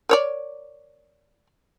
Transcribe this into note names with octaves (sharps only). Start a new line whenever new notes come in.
A#4 C#5 D5